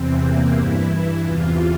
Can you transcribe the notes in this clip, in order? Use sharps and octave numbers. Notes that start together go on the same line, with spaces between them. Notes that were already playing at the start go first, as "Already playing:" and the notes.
Already playing: E2 C3 E3 C4
A#3
G2 E3 E4
E2 C3 E3 F4